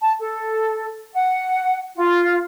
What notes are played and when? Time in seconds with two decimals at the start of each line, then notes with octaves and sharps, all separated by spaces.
0.01 A5
0.20 A4
1.14 F#5
1.95 F4